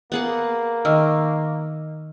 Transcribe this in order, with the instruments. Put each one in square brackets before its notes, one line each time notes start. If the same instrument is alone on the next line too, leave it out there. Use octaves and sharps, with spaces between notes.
[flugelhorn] A#3 [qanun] B3 G#4 F#5
[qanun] D#3 [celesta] D#5 E6 F6